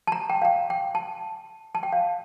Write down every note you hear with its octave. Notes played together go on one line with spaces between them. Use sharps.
A5
A#5
G5
F5
G5
G5
A5
A5
G5
F5